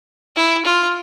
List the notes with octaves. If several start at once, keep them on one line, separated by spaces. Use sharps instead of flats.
E4
F4